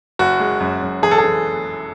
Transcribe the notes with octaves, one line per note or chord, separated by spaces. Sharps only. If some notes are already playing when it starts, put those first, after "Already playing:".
F#1 F#4
G#3
F#2
F#2
E3 G#4
A4
G#4
E3